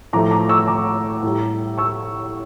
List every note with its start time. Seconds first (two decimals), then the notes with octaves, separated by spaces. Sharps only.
0.13 A2 F3 A3 A#5 D6
0.31 A#5 D6
0.49 C#6 E6
0.68 A#5 D6
1.23 A2 G3
1.78 C#6 E6